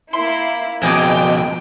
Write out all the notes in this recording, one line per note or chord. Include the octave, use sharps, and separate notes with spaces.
A#3 E4 C6
F2 B2 G#4 D#5 G5 D6